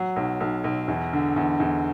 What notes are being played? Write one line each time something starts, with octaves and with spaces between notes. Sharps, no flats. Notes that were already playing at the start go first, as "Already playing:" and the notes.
Already playing: F#3
B1
B1
B1
E2
D3
E2
E2